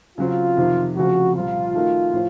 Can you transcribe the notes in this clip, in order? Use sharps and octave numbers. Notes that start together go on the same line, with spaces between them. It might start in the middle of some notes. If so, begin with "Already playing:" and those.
C#3 F#3 C4 F4
F2 C3 D#3
F1 F2 C#3 F3 F#4
C2 A#2 F3 F4
D#3 A3 D#4 F#4 A#4
A2 F3